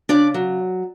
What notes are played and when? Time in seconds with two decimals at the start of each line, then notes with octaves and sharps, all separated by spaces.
0.09 C#3 D4 D5
0.34 F#3